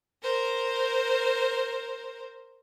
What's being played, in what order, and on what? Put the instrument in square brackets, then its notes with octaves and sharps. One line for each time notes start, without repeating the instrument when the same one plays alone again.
[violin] A#4 C5